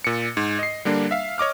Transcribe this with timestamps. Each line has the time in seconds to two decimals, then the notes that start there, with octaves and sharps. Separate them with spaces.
0.04 A#2 C#7
0.37 G#2
0.59 D#5 C7
0.85 D3 G3 A#3 D4
1.11 E5 F5
1.38 C#5 D#5 D6 F6